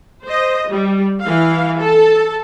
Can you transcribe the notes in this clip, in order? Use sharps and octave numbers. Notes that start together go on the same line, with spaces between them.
C5 D#5
G3
E3 F5
A4 A5